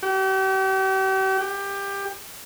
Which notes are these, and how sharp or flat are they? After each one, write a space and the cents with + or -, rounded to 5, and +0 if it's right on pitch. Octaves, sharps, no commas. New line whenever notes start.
G4 -40
G4 +20